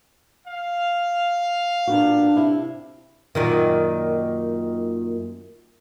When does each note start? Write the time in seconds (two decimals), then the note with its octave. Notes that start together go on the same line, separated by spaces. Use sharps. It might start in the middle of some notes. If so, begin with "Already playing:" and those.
0.47 F5
1.87 A#2 B3 D4 F#4
2.36 C3 E4
3.35 F#2 A#2 D#3